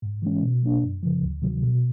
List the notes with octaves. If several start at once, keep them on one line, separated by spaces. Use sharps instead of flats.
G#2
E3 G#3 C#4
B2
F#3 A#3 D4
F#2
C#3 F3
D2
C3 D#3 F#3
B2